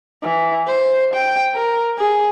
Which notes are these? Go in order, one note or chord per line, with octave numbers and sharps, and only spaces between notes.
E3
C5
G5
A#4
G#4